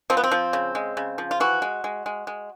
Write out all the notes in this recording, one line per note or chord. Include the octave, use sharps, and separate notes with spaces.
F3 C4
B3
C4
F3
C#3
G#3
C#3
F3
F4
E3 F#4
G#3
G#3
G#3
G#3